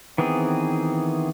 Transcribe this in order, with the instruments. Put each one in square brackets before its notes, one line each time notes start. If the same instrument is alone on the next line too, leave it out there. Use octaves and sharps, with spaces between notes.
[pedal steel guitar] D#3 E3 B3 C4 G#4